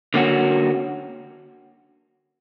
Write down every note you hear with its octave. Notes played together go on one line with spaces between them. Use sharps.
D3 A#3 C#4 F#4